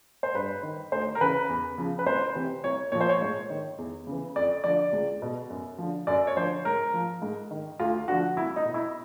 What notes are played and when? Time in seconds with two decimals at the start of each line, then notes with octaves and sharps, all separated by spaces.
0.23 C5
0.34 G2 B4
0.63 D#3
0.92 D2 C5
1.15 A#4
1.21 C#3 E3 B4
1.49 E2
1.78 C#3 F3
1.99 B4
2.06 C2 C5
2.35 C3 E3
2.64 C2 C#5
2.92 A#2 F3 C#5
3.01 C5
3.09 C#5
3.21 G#2 C#5
3.50 D#3
3.78 E2
4.07 C#3
4.12 E3
4.36 F2 D5
4.64 D3 F3 D5
4.93 C#2
5.22 B2
5.50 F#2
5.78 D3 F3
6.07 F#2 D5
6.27 C#5
6.36 D3 F3 C5
6.65 G#2 A#4
6.94 F3
7.22 G#2
7.51 D#3
7.79 D2 F4
8.08 D3 F3 F#4
8.37 C2 E4
8.56 D#4
8.65 B2
8.74 E4